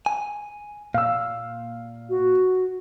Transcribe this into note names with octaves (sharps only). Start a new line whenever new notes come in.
G#5
A#2 F5 E6
F#4